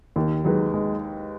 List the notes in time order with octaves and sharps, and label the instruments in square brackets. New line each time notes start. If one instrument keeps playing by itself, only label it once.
[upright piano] D#2 [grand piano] D#3
[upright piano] D#3 G#3 D#4 B4 [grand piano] F#3
[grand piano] G#3